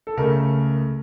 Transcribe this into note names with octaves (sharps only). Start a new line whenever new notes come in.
A4
C#2 C#3 A3 A#4